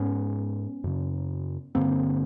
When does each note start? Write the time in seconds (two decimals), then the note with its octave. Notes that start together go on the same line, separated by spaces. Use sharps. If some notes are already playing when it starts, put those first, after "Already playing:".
Already playing: G#2 B3 C#4
0.84 F#2 C#3
1.75 G2 D3 A#3 C4